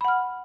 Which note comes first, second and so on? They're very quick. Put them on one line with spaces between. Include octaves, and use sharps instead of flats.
B5 F#5 F6